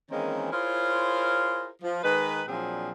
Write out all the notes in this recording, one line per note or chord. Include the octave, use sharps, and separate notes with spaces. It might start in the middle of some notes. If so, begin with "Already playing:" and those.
D#3 E3 G#3 A#3 C4 C#4
E4 F4 G#4 A#4 C5 C#5
F3
D#3 G#3 D#4 B4
A#2 F3 F#3 C4 D4 G#4